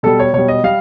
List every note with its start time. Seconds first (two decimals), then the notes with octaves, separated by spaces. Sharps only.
0.03 B2 G3 A4
0.19 C#5
0.33 B2 G3 C#5
0.48 D#5
0.64 G3 F5